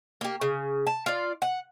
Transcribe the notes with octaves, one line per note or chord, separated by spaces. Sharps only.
A#3 G4
C#3
A5
F4 D5
F#5